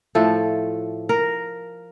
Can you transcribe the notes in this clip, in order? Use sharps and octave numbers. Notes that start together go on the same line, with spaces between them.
A2 F3 A3 A4
A#4